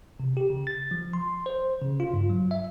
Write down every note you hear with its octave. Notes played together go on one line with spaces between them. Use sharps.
C3
G4
C#3
A6
F3
C6
C5
C#3
F4
G2
F#3
E5